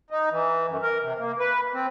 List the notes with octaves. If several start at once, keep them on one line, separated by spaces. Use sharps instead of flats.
D#4
E3
F#2
A#4
C3
A#3
B4
C4